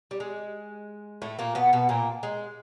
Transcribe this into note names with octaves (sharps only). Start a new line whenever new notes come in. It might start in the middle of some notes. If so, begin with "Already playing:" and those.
G3
G#3
A2 A3
A#2 A#3
B2 B3
B2 B3
A#2 A#3
G#3